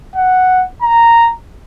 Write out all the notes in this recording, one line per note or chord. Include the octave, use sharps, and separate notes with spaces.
F#5
A#5